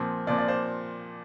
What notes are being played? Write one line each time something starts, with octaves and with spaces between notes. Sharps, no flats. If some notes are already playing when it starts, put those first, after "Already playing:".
Already playing: A#2 F3 C4
A#2 F3 C4 D5
D5
C5